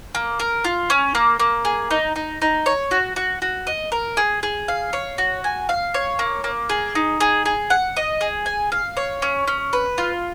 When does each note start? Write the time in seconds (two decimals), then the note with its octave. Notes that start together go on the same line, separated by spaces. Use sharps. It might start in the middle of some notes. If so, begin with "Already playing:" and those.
0.15 A#3
0.40 A#4
0.65 F4
0.90 C#4
1.15 A#3
1.40 A#3
1.65 G#4
1.91 D#4
2.16 D#4
2.42 D#4
2.66 C#5
2.91 F#4
3.16 F#4
3.42 F#4
3.67 D#5
3.92 A#4
4.17 G#4
4.43 G#4
4.68 F5
4.93 C#5
5.18 F#4
5.44 G#5
5.69 F5
5.94 C#5
6.19 A#3
6.44 A#3
6.70 G#4
6.95 D#4
7.20 G#4
7.46 G#4
7.70 F#5
7.97 D#5
8.21 G#4
8.46 G#5
8.72 F5
8.97 C#5
9.22 C#4
9.47 C#4
9.73 B4
9.98 F4